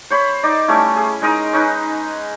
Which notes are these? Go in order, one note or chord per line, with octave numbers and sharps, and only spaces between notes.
C5 C#5 B5
D#4 D5
G3 A3 C#4 E4
G#4
G#3 D#4 A#4 D#6
C#4 D#4 B4